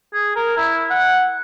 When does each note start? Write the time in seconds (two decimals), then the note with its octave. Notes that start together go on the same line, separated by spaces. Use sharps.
0.13 G#4
0.36 A#4
0.57 E4
0.90 F#5